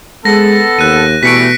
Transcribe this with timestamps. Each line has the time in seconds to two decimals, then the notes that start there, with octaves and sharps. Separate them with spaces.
0.25 G#3 B3 A4 A#6
0.79 D#2 F#6 D#7
1.23 B2 E3 G3 A3 B6 C#7 D7